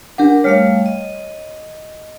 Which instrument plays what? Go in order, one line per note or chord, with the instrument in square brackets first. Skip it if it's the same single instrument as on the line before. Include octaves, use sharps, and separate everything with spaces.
[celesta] D4 F#5 [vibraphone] G4 A#4 D6
[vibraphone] G3 A3 F5 [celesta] C#5 F6
[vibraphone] D#5